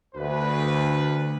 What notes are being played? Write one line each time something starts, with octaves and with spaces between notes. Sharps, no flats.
D2 B4